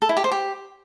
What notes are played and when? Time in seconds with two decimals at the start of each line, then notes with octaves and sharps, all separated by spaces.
0.02 A4
0.09 E4
0.17 G4
0.24 C5
0.32 G4